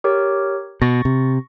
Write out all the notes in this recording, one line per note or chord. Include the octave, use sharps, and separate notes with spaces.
G4 A#4 C#5
B2 C#6 A6 A#6
C3